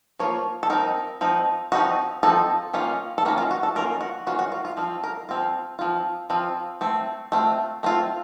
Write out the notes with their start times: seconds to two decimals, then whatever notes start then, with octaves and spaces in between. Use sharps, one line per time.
0.19 F3 A#3 F4 C#5
0.63 A4
0.70 F3 C4 D#4 A#4
1.21 F3 C4 D#4
1.72 F3 C4 D#4 F#4
2.23 F3 C4 D#4 A4
2.74 D#3 A#3 C#4 F4
3.18 A4
3.25 D#3 A#3 C#4 F4 F#4
3.38 F4
3.51 F#4
3.63 A4
3.76 D#3 A#3 C#4 F4 A#4
4.01 F#4
4.27 D#3 A#3 C#4 F4 F#4
4.39 F#4
4.52 F4
4.65 F4
4.77 F3 C4 F4
5.04 A#4
5.29 F3 C4 F4
5.79 F3 C4 F4
6.30 F3 C4 F4
6.81 A3 C4
7.32 A3 C4 F4
7.83 A3 C4 F4